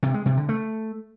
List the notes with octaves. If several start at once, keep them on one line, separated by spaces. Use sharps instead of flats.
C3
G#3
C3
D3
A3